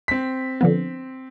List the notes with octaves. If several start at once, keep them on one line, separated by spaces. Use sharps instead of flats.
C4 B6
D3 F3 B3